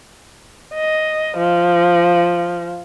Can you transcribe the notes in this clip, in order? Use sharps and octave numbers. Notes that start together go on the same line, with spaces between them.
D#5
F3